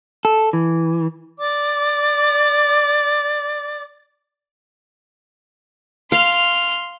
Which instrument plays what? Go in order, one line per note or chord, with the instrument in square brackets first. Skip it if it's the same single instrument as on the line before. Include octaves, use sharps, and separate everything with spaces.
[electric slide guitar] A4
E3
[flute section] D5 D6
[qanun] F5 [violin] C6 F6